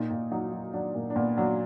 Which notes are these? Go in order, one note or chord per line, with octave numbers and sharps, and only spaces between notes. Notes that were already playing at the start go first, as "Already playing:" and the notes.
Already playing: A#2 D#4
A#2
F#3 D#4
F#3
F#3 D4
A#2 A#3
D4
A#2 B3
F#3 D4